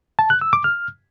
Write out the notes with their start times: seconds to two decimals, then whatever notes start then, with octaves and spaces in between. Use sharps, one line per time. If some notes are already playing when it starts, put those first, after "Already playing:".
0.19 A5
0.30 F#6
0.41 E6
0.53 D6
0.64 F6